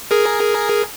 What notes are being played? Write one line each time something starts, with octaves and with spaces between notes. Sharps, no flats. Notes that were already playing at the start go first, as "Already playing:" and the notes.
G#4 A#4